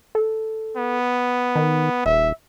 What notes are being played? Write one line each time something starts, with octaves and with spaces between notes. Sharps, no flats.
A4
B3
D#3
D#1 E5